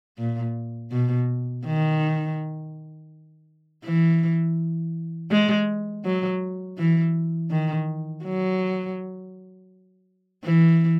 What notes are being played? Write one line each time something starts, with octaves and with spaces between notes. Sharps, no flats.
A#2
B2
D#3
E3
G#3
F#3
E3
D#3
F#3
E3